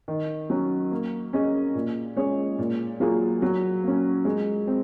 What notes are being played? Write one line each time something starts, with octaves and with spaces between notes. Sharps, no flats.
D#3
F#3 C#4
A#3
C#4 G#4 D#5
A#2
G#3 C#4 G#4 C#5
A#2
F#3 A#3 F4 G#4
F#3
A#3 C#4
G#3
C4